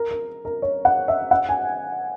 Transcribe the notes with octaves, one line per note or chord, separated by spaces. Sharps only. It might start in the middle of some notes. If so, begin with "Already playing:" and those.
Already playing: A#4
A#4
A#4
C#5
F#5
E5
F#5
G#5